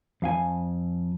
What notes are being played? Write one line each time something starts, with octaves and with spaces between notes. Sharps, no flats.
F2 F5 G#5